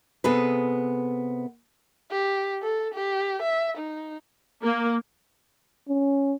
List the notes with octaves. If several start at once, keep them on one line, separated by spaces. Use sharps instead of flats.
C3 B3 G#4 A4 B4
G4
A4
G4
E5
D#4
A#3
C#4